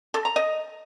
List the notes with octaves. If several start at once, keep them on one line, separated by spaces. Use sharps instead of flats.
A4
A#5
D#5